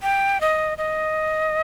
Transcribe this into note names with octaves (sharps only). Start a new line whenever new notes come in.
G5
D#5
D#5